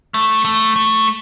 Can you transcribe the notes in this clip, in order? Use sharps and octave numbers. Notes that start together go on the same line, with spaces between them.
A3
A3
A3